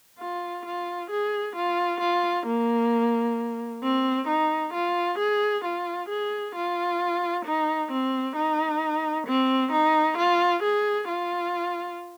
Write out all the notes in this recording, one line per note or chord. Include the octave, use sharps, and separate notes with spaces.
F4
F4
G#4
F4
F4
A#3
C4
D#4
F4
G#4
F4
G#4
F4
D#4
C4
D#4
C4
D#4
F4
G#4
F4